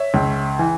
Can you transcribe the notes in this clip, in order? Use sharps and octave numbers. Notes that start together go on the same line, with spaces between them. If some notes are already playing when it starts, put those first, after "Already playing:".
Already playing: C#5 E5
C#2
E3